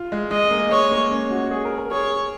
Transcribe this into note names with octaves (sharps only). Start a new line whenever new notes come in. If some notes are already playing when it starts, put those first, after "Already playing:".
Already playing: F4
G#3
G#3 D#5
A#3
G#3 C#5
A#3
C#4
F#4
F#4
G#4
A#4
A#4
G#4 C#5